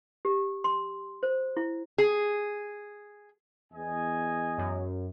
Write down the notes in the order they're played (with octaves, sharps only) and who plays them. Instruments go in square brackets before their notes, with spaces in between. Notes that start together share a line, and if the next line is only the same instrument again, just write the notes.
[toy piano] G4
C6
C5
E4
[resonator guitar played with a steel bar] G#4
[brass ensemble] E2 D#5 G#5
[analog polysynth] F#2